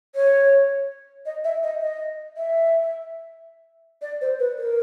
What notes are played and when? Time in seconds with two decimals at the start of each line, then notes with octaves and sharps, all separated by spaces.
0.15 C#5
1.26 D#5
1.44 E5
1.63 D#5
1.81 D#5
2.37 E5
4.02 D5
4.21 C5
4.39 B4
4.58 A#4